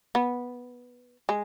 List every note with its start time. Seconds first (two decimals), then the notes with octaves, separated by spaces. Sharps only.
0.15 B3
1.29 G#3